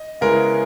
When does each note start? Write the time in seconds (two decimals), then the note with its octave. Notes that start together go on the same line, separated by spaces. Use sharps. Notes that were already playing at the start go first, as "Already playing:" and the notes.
Already playing: D#5
0.21 C#3 G#3 B3 E4 A#4